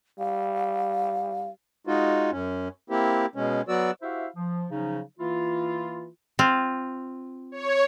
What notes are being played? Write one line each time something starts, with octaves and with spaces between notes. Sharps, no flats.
G3 F5
G#3 D#4 F4 F#4
F#2 C#4
A#3 C4 E4 G4
B2 G#3 C#4
F#3 B3 F#4 D5 E6
E4 F#4 G4 C5 E5 F5
F3
C#3 F3 F#3 C#4 D#4
E3 A#3 E4 F4
C4 F4
C#5